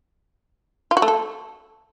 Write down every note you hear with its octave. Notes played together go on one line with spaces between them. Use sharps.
F4
F#4
A3
A4